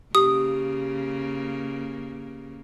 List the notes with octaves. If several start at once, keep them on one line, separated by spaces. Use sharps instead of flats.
C#3 A#3 G4 D#6